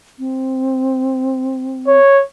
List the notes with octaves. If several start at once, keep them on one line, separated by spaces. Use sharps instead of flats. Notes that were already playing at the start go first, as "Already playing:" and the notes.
C4
C#5